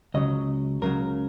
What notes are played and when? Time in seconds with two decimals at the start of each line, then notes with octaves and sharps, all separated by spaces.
0.14 C#2 C#3 F#3 D#5
0.82 C#2 C#3 F#3 A#4